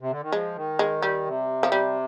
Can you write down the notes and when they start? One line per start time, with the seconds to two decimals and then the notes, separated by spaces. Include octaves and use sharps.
0.01 C3
0.11 D3
0.22 D#3
0.32 F3 G#3
0.56 D#3
0.79 G#3
1.02 G3
1.26 C3
1.63 F3
1.72 G3